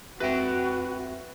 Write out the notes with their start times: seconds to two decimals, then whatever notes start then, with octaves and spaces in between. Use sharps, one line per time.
0.20 F2 F#4 B4 E5 G5 A#6